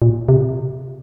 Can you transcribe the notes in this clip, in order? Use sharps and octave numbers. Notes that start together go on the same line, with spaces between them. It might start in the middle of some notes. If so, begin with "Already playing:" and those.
A#2
C3